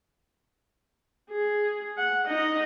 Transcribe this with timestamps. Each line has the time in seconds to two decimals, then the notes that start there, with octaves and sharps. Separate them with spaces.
1.30 G#4
1.98 F#5
2.27 D#4 D#5